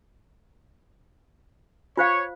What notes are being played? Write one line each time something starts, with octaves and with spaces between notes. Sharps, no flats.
F4 C5 C#5 F5